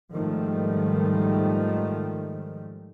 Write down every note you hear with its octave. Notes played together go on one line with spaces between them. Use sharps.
G#2 D#3 F3 G3 A3